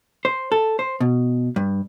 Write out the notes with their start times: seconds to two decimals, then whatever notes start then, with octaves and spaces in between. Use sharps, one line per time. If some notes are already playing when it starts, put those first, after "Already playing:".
0.25 C5
0.52 A4
0.79 C5
1.00 B2
1.56 G2